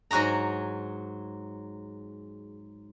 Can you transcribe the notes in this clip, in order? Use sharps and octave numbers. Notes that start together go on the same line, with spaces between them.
G#2 F#3 F#4 G#4 A#5